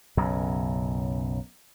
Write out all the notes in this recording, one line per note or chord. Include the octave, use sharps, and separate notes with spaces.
B1 F#2 C#3